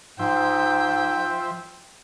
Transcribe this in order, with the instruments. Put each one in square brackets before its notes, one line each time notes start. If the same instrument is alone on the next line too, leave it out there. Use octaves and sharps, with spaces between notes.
[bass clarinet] G#2 [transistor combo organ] F3 C5 E5 [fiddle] G5